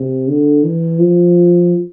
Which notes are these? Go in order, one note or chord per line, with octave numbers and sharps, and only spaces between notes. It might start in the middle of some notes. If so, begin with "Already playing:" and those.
Already playing: C3
D3
E3
F3